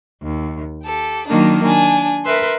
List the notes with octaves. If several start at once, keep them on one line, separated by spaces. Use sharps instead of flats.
D#2
G4 A4
D#3 F#3 A#3 D4 D#4
D4 G#5
A#4 B4 E5 C6